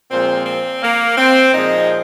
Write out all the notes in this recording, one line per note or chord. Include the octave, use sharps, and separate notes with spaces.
A#2 F3 G#3 C4
C4
A#3
C4
A#2 F3 G#3 D#4